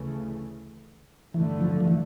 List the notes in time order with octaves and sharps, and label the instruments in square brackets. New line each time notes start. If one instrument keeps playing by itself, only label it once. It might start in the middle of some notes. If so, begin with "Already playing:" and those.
Already playing: [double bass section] D2 C#3 E3 A3
[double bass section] G2 D3 A3 [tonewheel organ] E3
[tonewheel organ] F3
F3
E3